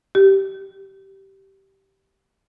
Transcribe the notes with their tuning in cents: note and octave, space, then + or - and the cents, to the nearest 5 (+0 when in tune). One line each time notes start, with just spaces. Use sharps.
G4 -15